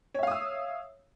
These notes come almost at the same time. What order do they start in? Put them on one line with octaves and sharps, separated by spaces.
C#5 E5 F5 D#6 E6